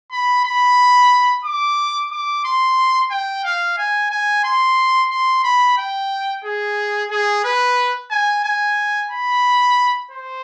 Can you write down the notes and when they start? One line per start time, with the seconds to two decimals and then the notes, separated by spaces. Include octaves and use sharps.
0.11 B5
0.44 B5
1.44 D6
2.11 D6
2.44 C6
3.11 G5
3.44 F5
3.78 G#5
4.11 G#5
4.44 C6
5.10 C6
5.44 B5
5.77 G5
6.44 G#4
7.10 G#4
7.44 B4
8.11 G#5
8.44 G#5
9.11 B5
10.11 C5